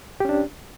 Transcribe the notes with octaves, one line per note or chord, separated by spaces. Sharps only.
C#4 D4 G4